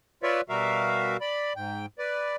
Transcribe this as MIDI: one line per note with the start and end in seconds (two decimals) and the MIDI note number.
0.23 0.41 65
0.23 0.41 71
0.23 0.41 73
0.23 0.41 74
0.23 0.41 76
0.49 1.17 47
0.49 1.17 55
0.49 1.17 66
0.49 1.17 70
0.49 1.17 76
0.49 1.17 77
1.21 1.53 74
1.21 1.53 83
1.56 1.86 44
1.56 1.86 79
1.99 2.36 71
1.99 2.36 74